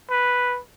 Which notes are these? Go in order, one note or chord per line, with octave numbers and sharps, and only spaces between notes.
B4